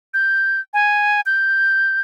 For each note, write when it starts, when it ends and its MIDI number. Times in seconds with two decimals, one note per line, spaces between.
0.14 0.60 91
0.74 1.21 80
1.26 2.01 91